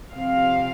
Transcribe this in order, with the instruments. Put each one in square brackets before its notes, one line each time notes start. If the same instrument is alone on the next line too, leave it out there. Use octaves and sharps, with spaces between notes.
[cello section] C3 F3 C4 F5